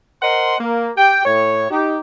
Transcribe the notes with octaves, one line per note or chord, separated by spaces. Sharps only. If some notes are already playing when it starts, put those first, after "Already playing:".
A#4 C5 D#5 F#5 C6
A#3
G4 G5
A2 C#5
D#4 G4